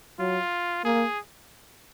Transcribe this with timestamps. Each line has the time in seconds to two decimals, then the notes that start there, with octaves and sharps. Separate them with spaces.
0.19 F#3 F4
0.85 A#3 G#4